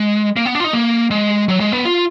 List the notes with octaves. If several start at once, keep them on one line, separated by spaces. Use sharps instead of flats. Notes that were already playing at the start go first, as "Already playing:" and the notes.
Already playing: G#3
A#3
B3
D4
F4
D#4
A#3
G#3
F#3
G#3
B3
F4